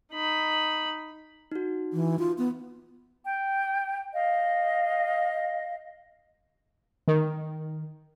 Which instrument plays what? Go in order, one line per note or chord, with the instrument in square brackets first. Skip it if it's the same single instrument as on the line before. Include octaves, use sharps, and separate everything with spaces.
[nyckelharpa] D#4 B5
[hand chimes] D#4 F#4
[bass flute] E3
F4
B3
[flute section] G5
D#5 F5
[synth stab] D#3